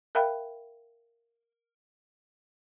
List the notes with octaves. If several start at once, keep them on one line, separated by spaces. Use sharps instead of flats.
A#4 E5 F5 G5 B5